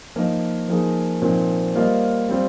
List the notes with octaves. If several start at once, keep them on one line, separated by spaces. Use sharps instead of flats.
F3 A#3 D#4 A#4 D#5
F3 A#3 D#4 G#4
A#2 F3 C4 D#4
G3 A#3 F4 C5 D#5
G3 C4 F4